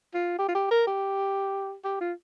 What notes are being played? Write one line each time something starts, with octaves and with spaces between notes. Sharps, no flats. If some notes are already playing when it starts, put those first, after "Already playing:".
F4
G4
F4
G4
A#4
G4
G4
F4